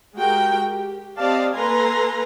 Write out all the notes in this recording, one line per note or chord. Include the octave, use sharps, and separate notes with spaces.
G#3 F#4 G4 A#4 G5
G4
C4 G4 D5 D#5 F5 A5
A#3 A4 B4 G#5 A#5 C6